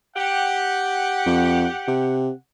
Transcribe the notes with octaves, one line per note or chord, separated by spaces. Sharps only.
G4 F#5
F2
C3